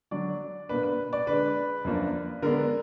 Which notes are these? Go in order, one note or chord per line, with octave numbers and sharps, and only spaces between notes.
D3 F#3 D4 D5
B2 A#3 D4 B4
B4
D5
D3 G#3 D4 B4
F#2 F3 A#3 D4
D3 G#3 B3 D4 A#4